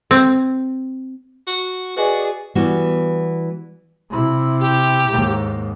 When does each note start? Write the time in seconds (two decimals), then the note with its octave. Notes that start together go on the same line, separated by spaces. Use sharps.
0.11 C4
1.47 F#4
1.97 F#4 G#4 B4 D5 D#5 G#5
2.55 E3 G3 B3 F#4
4.10 C3 E4
4.60 G4
5.09 D#2 G#2